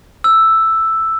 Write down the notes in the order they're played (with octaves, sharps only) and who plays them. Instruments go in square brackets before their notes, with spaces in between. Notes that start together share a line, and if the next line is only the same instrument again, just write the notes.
[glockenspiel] E6